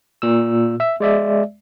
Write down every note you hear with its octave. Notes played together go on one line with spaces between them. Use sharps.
A#2 E6
E5 E6
G#3 D5 E5